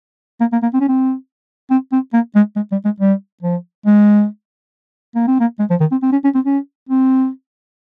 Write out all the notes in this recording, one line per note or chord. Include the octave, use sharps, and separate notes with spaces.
A#3
A#3
A#3
C4
C#4
C4
C4
C4
A#3
G#3
G#3
G3
G#3
G3
F3
G#3
A#3
C4
A#3
G#3
F3
D#3
C4
C4
C#4
C#4
C4
C#4
C4